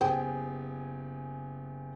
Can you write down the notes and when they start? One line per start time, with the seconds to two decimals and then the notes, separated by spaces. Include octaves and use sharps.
0.01 F#1 B3 G4 G#4 C5 G5 G#5